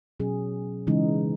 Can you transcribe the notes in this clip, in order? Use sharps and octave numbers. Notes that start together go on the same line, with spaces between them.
B2 F#3 C#4 G#4
C#3 E3 G#3 D#4